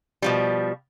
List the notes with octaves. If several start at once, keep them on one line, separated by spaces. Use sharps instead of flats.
B2 F3 G3